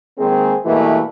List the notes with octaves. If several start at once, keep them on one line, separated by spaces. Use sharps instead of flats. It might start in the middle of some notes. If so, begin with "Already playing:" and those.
D#3 G#3 A#3 C4 G#4
B2 E3 G3 A3 A#3